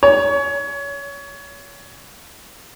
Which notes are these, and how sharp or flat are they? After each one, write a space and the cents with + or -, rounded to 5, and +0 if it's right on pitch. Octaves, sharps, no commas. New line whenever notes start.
C#5 +25